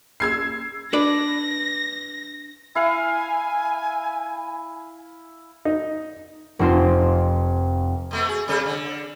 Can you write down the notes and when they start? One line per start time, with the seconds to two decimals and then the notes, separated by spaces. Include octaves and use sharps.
0.20 E6 G#6 C7
0.93 D4 B4 D5 A#6
2.75 E4 F5 G#5
5.65 D#4
6.59 F1 F2 C4 F4 C6
8.11 B2 A3 B3
8.29 G#4
8.48 C3 G3 A4
8.66 D3